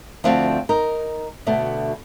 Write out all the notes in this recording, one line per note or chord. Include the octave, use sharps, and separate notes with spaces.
D2 F3 C4 F5 A5
D#4 A#4
D2 B2 A3